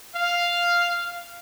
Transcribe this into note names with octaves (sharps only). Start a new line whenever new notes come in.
F5